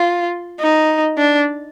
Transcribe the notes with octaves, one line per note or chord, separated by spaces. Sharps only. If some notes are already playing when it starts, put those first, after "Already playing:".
Already playing: F4
D#4
D4